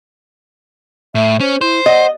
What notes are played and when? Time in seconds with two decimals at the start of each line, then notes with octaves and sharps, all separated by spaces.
1.15 A2 E5
1.40 C#4 C5
1.61 E4 C5
1.86 D#5 F#5